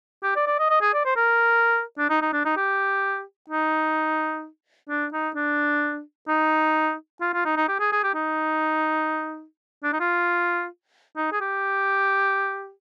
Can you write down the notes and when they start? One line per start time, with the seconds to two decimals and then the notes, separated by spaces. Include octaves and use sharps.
0.24 G4
0.36 D5
0.47 D5
0.59 D#5
0.70 D#5
0.82 G#4
0.94 D5
1.05 C5
1.17 A#4
1.99 D4
2.10 D#4
2.22 D#4
2.33 D4
2.45 D#4
2.57 G4
3.50 D#4
4.90 D4
5.13 D#4
5.36 D4
6.29 D#4
7.21 F4
7.34 F4
7.45 D#4
7.57 D#4
7.69 G4
7.80 G#4
7.92 G#4
8.04 G4
8.15 D#4
9.84 D4
9.93 D#4
10.01 F4
11.17 D#4
11.32 G#4
11.41 G4